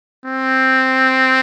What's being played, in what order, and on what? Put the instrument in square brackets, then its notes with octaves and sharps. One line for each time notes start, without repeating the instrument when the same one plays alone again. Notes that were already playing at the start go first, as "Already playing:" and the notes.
[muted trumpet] C4